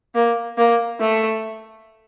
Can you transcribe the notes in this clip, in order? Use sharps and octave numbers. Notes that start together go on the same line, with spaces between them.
A#3
A#3
A3